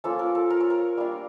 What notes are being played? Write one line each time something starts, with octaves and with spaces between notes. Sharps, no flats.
F3 A#3 C#4 F4 A4
A#4
A4
A#4
C#5
A#4
G3 A#3 D4 F4